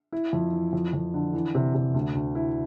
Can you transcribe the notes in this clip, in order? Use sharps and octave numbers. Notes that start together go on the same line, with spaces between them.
E4
F2
E3
F2
F2
D3
E3
C3
C3
D2
D2
E4